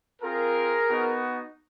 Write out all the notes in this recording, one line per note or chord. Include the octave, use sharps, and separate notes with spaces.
C4 F4 G#4 A#4
B3 D#4 F#4